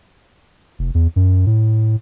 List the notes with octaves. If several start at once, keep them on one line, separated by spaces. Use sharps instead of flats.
F1
E2
F#2
A2